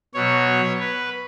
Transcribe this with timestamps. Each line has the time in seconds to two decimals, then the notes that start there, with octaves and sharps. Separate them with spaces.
0.14 B2 F#3 C#5
0.80 B4